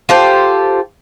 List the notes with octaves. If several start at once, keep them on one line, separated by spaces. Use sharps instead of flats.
F4 G4 A4 C5